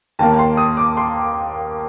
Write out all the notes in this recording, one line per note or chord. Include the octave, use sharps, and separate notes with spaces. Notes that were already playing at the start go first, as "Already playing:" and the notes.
D#2 D#3 A#3 A5
C6
D#6
D6
C6